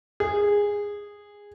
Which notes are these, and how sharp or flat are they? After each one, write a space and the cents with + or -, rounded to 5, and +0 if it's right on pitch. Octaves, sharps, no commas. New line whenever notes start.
G#4 -15